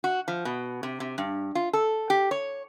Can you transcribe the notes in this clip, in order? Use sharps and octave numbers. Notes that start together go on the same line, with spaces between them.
F#4
F3
B2
C3
C3
G2
F4
A4
G4
C#5